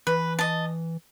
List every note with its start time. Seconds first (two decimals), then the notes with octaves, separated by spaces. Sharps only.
0.07 E3 B4
0.39 D#5 A5